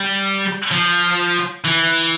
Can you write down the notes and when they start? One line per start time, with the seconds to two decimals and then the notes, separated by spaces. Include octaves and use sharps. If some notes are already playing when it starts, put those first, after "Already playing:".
Already playing: G3
0.72 F3
1.65 E3